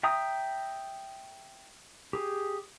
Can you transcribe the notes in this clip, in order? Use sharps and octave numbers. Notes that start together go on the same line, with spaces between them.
E5 G5 A#5 D#6
G4 G#4